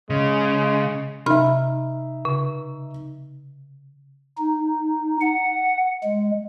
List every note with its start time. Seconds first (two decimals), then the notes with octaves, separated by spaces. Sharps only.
0.10 C#3 G#3
1.26 C3 D#4 E5 B5 F6
2.25 C#3
4.38 D#4
5.21 F#5
6.04 G#3